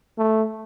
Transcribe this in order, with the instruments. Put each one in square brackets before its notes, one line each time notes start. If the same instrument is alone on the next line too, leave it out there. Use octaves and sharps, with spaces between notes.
[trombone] A3